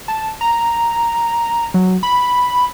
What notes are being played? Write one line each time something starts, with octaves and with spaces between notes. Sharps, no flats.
A5
A#5
F#3
B5